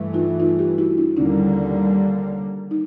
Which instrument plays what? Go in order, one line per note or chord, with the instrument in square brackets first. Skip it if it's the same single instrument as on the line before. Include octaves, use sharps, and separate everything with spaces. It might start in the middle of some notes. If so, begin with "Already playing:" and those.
Already playing: [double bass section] G2 E3 A3
[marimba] D#4 F4
D#4 F4
F4 G4
E4 F#4
D4 E4
[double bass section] D#2 D3 G3 A#3 [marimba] C#4 D#4
[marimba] D#4